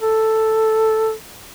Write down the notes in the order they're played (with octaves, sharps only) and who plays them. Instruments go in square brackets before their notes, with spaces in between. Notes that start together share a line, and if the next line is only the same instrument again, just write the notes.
[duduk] A4